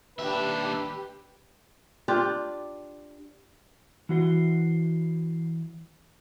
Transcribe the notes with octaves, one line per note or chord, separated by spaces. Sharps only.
D#2 D4 G4 B4 E5
D4 F4 G4 D5
E3 F#4 C5